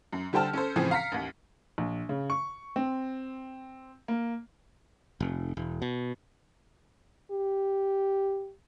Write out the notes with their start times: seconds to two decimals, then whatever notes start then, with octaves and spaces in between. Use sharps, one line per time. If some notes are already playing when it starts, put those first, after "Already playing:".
0.13 F#2
0.33 D3 G3 C5 G5 A5 F6
0.53 C#4 A4 C5
0.76 A2 C#3 E3 F3 C4 G#4
0.91 F5 A#5 F6 B6 C#7
1.12 A1 D#2
1.78 A#1
2.09 C#3
2.30 C#6
2.76 C4
4.08 A#3
5.20 F1
5.57 E1
5.82 B2
7.31 G4